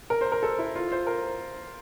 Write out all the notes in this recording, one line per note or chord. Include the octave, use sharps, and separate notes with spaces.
A#4
C5
A#4
A4
E4
F4
C5
A#4